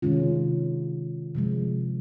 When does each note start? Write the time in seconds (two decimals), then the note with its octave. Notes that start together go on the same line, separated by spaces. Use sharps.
0.02 C3 D#3 G#3 C#4 F4
1.35 C3 F3 G#3